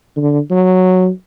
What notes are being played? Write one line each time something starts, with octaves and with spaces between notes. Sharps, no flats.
D3
F#3